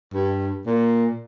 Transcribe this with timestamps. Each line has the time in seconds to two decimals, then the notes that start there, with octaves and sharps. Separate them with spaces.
0.14 G2
0.66 A#2